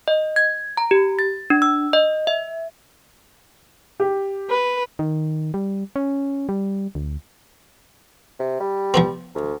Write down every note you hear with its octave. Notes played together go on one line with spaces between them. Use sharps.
D#5
G#6
A#5
G4
A6
D4
E6
D#5
E5
G4
B4
D#3
G3
C#4
G3
D2
C3
G3
F3 B3 C4
D2